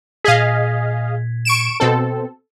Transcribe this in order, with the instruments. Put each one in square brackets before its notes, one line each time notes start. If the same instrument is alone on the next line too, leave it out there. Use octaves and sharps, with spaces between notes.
[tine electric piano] A#2 G#6 B6 [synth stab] G#4 D#5 F5
[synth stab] C#6 D7 E7
B2 C4 A4